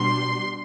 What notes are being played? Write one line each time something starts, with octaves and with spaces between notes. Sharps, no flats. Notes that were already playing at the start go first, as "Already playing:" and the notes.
Already playing: B2 G3 D4 C6